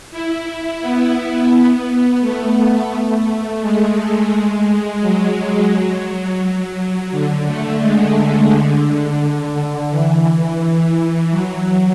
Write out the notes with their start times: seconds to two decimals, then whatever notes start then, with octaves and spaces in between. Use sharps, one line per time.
0.11 E4
0.81 B3
2.21 A3
3.61 G#3
5.01 F#3
6.40 F#3
7.11 D3
7.46 A3
7.81 G#3
8.51 D3
9.90 E3
11.31 F#3